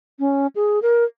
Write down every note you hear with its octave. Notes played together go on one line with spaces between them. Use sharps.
C#4
G#4
A#4